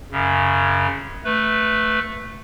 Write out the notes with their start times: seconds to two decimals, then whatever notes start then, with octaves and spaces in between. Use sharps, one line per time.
0.12 F#2 C#3
1.24 A3 B4